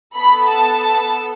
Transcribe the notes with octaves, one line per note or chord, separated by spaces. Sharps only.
B3 A4 B5
A5